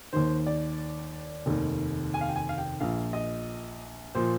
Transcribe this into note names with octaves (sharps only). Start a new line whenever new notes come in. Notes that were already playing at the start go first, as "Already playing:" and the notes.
D#2 D#3 C5
D5
F1 D#2 D#3
G#5
F5
G5
G#5
F5
G5
A#1 A#2 F3 F5
D#5
A#2 F3 C5